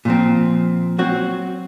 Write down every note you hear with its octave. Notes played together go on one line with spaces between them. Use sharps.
A#2 F3 C4
F#3 C4 F#4